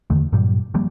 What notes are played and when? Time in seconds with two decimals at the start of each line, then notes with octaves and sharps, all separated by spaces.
0.10 E2 D3 D#3 A3
0.32 G2 A#2 F#3 G3
0.74 D#3 F3 G3 A#3